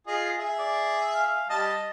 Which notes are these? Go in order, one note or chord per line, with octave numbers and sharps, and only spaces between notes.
F4 G#4 D#5
G#4 E5 G#5
D5
F5
G3 D#5 A5